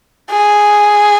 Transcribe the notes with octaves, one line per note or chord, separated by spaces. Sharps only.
G#4